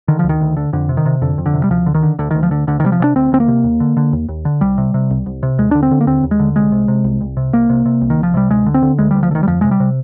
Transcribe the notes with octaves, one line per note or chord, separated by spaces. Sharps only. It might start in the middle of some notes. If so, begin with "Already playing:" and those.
D3 D#3
D2 F3
D#3
D2
D3
F2 D3
C3
D#3
C3
F2 D3
F2
D3
C3
G3
D2 F3
D3
D#3
D3
D2 D3
D#3
D2
F3
D3
D2 D3
D#3
C3 G3
F3
C3 D4
D2 C4
D2 C4
A#3
C3
D#2
D3
D3
D#2
D#2
D3
C2 G3
C3
C3
C2
C2
C3
D#2 G#3
D3 D4
C4
D3
A#3
D#2 C4
D#2
G#3
D3
C2 G#3
C3
C3
C2
C2
C3
C2 A#3
C3
C3
C2
D#3
C2 F3
C3 G3
D2 G#3
D3
C4
D3
D2 G#3
G3
D2
F3
D3
D#3
G3
F2 F3
C3 G#3
G3
C3